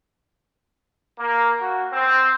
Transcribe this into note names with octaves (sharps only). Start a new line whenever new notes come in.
A#3
F#4
C4